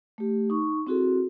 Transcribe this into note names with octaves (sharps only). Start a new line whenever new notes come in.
A3 G4
D#4 C#6
C4 E4 F#4 G#4 A4